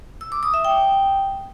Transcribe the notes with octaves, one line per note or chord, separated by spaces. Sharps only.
E6
D6
D#6
E5
G5